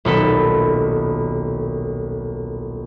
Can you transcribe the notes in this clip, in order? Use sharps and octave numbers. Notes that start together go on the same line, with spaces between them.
D#1 B1 A4 B5